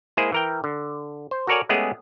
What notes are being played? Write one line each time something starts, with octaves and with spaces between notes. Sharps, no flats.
G#3 A#3 E4 G#4 C5
E3 A#4 G5
D3
C5
F#4 A4 A#4 C#5 D5 G#5
G#3 A3 B3 C#4 G4 G#4